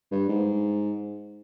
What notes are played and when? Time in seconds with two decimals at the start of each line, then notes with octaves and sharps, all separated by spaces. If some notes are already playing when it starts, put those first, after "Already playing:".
0.12 G2
0.29 G#2